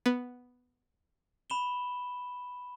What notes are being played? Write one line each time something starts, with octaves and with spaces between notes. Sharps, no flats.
B3
B5 E7 G7